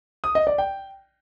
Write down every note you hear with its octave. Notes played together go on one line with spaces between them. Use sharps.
D#6
D#5
D5
G5